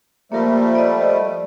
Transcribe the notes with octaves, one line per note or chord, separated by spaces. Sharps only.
F3 G3 A3 A#3 A#4
D5 D#5
D5